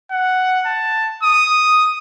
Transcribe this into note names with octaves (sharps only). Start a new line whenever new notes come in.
F#5
A5
D#6